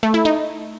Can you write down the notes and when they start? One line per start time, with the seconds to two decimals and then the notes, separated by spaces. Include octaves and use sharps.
0.03 A3
0.14 E4
0.25 D#4